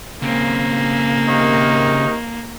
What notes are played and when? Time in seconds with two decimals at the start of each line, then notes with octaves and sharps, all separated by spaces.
0.22 C#3 A#3 C4
1.27 C3 D#3 D#4